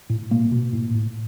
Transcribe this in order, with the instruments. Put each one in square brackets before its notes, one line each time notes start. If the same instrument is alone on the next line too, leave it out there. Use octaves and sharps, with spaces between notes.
[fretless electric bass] A2
B2 A#3
B2
A2
A2